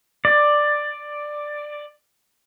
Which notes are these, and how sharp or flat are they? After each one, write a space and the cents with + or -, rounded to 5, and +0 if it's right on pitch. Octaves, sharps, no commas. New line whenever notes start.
D5 +10